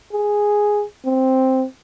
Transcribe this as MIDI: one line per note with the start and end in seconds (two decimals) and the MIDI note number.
0.13 0.84 68
1.05 1.65 60